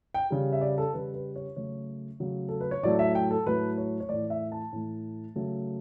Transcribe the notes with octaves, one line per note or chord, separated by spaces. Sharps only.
G5
C#3 G3
E5
D5
A4
C#3 G3 B4
B4
C#5
C#3 F#3 A3 C#5
C#3 F#3 A3
A4
B4
C#5
A2 F#3 A3 D5
E5
G5
A4
A2 F#3 A3 B4
C#5
C#5
A2 E3 A3 D5
E5
A5
A2 E3 A3
C#3 F#3 A3